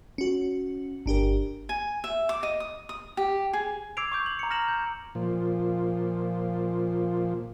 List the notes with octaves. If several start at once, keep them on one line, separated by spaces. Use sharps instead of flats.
C#4 F#4
G1 D4 G4 A#4
G#5
E5
D6
D#5
D#6
D#6
G4
G#4
D6 E6 G#6 C7 D7 F7
C#6 D6 G6
F#7
A#5 C#7
F6 A#6 C#7 E7 F#7
G6
A#2 F3